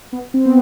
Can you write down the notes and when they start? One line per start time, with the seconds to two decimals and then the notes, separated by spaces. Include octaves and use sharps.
0.13 B3
0.34 C4
0.46 B3